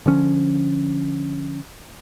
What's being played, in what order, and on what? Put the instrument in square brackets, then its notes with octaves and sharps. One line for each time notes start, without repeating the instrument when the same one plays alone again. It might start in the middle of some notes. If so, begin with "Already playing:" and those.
[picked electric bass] D3 F3 C#4